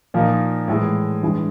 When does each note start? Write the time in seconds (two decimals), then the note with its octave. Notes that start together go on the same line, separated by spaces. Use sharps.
0.14 A#2 F3 A#3 D#4
0.68 A2 E3 G#3
1.23 G2 E3 G#3